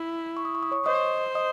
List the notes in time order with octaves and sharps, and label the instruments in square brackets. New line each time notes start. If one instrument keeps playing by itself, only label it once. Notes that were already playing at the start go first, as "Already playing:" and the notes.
Already playing: [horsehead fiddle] E4
[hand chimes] C#6
D#6
C#6
D#6
C#5 C#6
[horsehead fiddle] C5 [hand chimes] D#5 D#6
[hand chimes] D#5 D#6